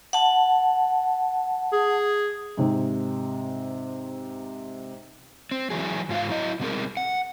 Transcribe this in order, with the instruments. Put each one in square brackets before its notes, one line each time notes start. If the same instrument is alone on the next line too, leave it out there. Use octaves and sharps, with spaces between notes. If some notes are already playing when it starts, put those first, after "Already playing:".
[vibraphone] F#5 A5
[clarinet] G#4
[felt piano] G#2 C3
[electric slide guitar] C4
E3 F#3 G#4
G#2 F4 F5
F#3 E4 D#5
B2 G3 C4 G#4 A#4
F#5